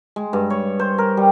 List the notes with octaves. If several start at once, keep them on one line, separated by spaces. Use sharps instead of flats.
G#3
G2
C#5
C5
A#4
G3